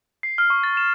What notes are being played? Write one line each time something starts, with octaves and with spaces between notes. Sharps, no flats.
C7
F6
C#6
A6
E7